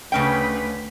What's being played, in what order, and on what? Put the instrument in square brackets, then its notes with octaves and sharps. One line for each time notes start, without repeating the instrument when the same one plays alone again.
[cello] D2 B4 [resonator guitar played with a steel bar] C#3 C#4 G5